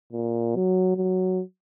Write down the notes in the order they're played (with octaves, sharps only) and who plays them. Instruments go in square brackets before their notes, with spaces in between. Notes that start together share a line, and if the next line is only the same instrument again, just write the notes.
[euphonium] A#2
F#3
F#3